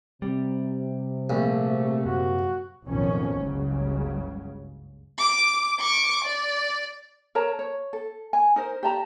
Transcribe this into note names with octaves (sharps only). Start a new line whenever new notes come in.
C3 G3
A#1 A3
F#2 F#4
B1 F2 A2 D#3 F3 C#4
F#1 C#2 G2 C#3 F#3
D6
C#6 D6
D5
A#4 C#5 A5 A#5
C#5
A4
G#5
D#4 A#4 C5
G4 D5 A5 A#5